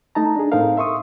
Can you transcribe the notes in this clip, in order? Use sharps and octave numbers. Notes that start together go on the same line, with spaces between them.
A3 D#4 A5 A#5
D4 G#4
A2 C4 D#4 A4 A#4 F5
E5 C6 C#6 D#6